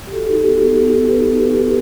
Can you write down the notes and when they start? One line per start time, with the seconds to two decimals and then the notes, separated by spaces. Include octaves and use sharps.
0.07 G4
0.12 F#4 A4
0.28 D#4 F#4
0.34 G4
0.44 B3
0.56 B3 F#4
0.77 F#4 G4
0.93 D#4
1.09 B3 B4
1.26 B3
1.42 F#4 G4
1.57 D#4